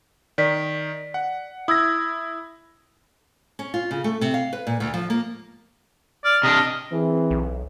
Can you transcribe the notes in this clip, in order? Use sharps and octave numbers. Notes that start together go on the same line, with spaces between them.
D#3 D5 B6
F#5
E4 D#6 E6 G#6 A#6
C#4
F4
C#3
A3
C3
F5
B4
A#2
D2
F3
A#3
D5 F6
C3 D4 D#5
E3 C4 G#4
B1